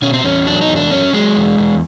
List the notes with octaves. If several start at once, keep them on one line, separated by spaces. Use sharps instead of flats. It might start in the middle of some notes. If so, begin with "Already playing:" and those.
B2 C#4
C4
E2 C#4
F#3 D4
D#4
E2
D4
F#3 C#4
F#3 G#3
E2
E2